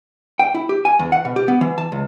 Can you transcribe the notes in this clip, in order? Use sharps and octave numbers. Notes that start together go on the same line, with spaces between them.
G5
E4
G4
G#5
E2
F#5
B2
G4
B3
E3
A5
C#2